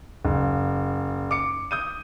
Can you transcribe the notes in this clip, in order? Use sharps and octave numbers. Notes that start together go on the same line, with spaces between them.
F#1
D6 C#7
D#6 G6 D#7